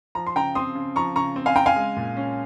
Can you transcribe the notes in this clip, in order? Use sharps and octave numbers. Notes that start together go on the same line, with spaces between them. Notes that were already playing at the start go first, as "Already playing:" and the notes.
F3 A#5
C6
C#3 G5 A#5
C4 C6 D#6
C#3
F3 A#5 C#6
C#3 A#5 C#6
C4
F5 G#5
C#3 G5 A#5
F5 G#5
G#3
A#2
C#4